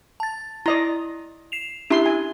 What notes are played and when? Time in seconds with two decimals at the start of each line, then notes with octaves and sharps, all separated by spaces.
0.20 A5 A6
0.66 E4 D5 D#5 A#5
1.52 C7 E7 F7
1.90 C#4 D4 E4 G4 C6
2.06 G#5